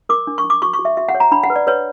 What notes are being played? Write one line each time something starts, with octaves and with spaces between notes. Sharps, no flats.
A#4 D6
D4
C#6
D4
D6
F#4 C#6
C#6
F#4
E5
F#4 E5
F#5
C#5
A#5
D4 B5
F#5
B4
D5
B4 C#5